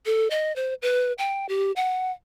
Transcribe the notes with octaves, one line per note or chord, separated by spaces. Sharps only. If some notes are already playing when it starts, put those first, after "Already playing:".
A4
D#5
C5
B4
G5
G4
F#5